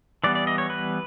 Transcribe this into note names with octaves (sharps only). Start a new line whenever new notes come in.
E3 G3 B3 D5
D5
D#5
C#5
B4